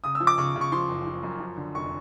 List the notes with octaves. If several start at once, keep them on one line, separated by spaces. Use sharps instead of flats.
C#3 D#6
E6
F3
D6
C#3 C#6
C#3
C#6
F3 C6
F#1
F3
F#2
F3
D3
F1 C#6